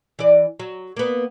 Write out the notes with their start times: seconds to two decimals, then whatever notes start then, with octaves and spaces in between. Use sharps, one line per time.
0.19 E3 D5
0.60 F#3
0.96 A#3 B3